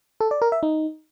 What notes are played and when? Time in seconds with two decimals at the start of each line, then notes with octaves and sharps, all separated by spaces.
0.21 A4
0.31 D5
0.42 A#4
0.52 E5
0.63 D#4